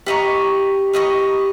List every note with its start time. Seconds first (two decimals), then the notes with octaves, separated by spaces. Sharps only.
0.06 G4 B4 D#5 A#5 C#6
0.93 G4 B4 D#5 A#5 C#6